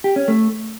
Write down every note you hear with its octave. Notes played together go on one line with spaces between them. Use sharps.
G4
C#4
A3